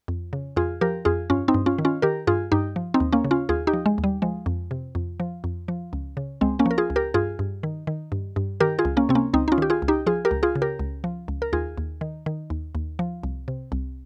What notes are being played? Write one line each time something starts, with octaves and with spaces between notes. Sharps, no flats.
F2
C#3
F2 F4 G#4
F3 G4 A#4
F2 F4 G#4
G2 C#4 F4
C4 D#4
G2
C#4 F4
D#3
C#4 F4
D#3 G4 A#4
G2 F4 G#4
G2 D#4 G4
F3
C4 D#4
D#2
A#3 C#4
C#3
C#4 F4
D#2 F4 G#4
D#4 G4
F3
G#3
D#2
G3
F3 G#3
F2
C3
F2
F3
F2
F3
C#2
C#3
C#2 G#3 C4
A#3 C#4
F3 A#4
F4 G#4
C#2
G4 A#4
G2 F4 G#4
G2
D#3
D#3
G2
G2
D#3 G4 A#4
F4 G#4
C#2
A#3 C#4
C3 C4
A#3 C#4
C#2 C4 D#4
D#4
C#4 F4
D#3 G4
F4 G#4
C#2
D#4 G4
F3 F4 G#4
G4 A#4
C#2
F4 G#4
C#3
G4 A#4
C#2
F3
C#2
A#4
D#2 F4 G#4
D#2
D#3
D#3
D#2
D#2
F3
C2
C3
C2